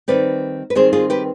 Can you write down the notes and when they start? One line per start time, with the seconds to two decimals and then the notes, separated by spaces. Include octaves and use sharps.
0.08 D#3 G3 C4 B4 D5
0.70 B4
0.75 D#3 G3 C4 G#4 C5
0.93 F4 G#4
1.10 G4 B4